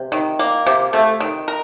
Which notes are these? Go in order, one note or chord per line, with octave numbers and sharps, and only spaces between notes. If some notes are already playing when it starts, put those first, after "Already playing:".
Already playing: C3
D#3
A#3
C3
C3 A3
D#3
A#4